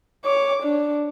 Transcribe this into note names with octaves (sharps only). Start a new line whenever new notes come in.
C#5 D6
D4